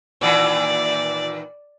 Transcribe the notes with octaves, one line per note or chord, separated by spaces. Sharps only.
A#2 D#3 E3 D5